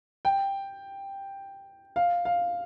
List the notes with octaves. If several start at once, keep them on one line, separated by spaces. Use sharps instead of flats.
G5
F5
F5